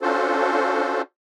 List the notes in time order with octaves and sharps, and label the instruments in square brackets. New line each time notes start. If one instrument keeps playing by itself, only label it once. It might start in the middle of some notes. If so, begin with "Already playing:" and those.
[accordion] C#4 D4 F4 F#4 A4 C5